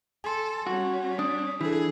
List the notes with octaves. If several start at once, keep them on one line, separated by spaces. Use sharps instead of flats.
A4 G#5 C6
G3 C#4 F#4
D4 D#6
E3 D4 G#4 A4